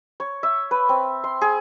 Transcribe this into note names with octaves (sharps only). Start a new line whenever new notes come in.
C#5
E5
B4
C4
C6
G#4